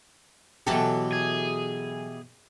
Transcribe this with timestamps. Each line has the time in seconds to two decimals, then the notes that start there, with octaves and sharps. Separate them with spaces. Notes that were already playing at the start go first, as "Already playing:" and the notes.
0.67 B2 E3 F#3 F#4 G4 A4
1.13 G#4